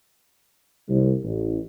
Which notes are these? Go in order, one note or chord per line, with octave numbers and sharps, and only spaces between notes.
C2
A1